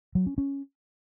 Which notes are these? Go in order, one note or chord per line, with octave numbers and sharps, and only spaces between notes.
F#3
C#4
C#4